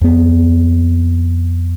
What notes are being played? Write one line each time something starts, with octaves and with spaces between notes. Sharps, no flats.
F2 B3